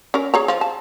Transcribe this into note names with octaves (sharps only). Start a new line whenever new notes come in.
C#4 A#4
G#4 C#5 A#5
F3
A5